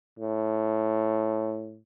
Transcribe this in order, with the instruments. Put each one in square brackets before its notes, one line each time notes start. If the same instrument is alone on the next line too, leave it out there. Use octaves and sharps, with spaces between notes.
[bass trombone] A2